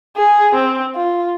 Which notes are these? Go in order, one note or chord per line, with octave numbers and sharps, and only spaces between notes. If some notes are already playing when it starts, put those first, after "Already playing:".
G#4
C4
F4